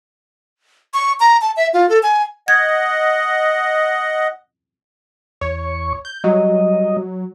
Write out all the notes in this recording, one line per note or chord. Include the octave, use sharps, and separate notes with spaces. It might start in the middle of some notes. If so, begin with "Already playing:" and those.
C#6
A#5
A5
E5
F4
A4
G#5
D#5 F#5 G#6
E2 C#5 C#6
G6
F#3 G3 D#5